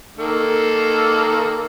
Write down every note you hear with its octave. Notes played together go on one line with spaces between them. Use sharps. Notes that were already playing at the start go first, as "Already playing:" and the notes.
D#3 A#3 A4